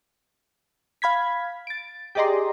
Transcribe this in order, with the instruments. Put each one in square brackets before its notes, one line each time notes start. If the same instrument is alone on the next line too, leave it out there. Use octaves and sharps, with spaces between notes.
[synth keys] F5 B5 G#6 B6
A6 D7
G4 G#4 D5 D#5 A#5 C6